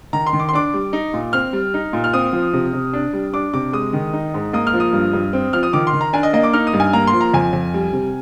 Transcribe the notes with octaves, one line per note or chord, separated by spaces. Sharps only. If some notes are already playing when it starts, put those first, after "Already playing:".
D#3 A#5
C6
D#3
D6
C6
D4 D6
G3
D#4
A#2
C4 F6
G3
D#4
A#2
F6
C4 D#6
F3
C3
C3
D4
G3
D4 D6
C3 D6
G#3 D#6
D#3
D#4
G#2
A#3 D#6
F6
F3
D#6
G2
G2
C4
F3 F6
D#6
D#3 D6
C6
D#3
A#5
D4 G#5
D#5
A#3 D#5
D6
D#4 F6
D#6
G2
G#5
A#3 A#5
C6
F3
A#5
F2 G#5
F2
G3
C3